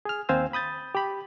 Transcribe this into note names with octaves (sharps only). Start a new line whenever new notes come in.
G#4 F6
D#2 C4 C5 F5 G#5 E6
B5 D#6 G6 A6
G4 B5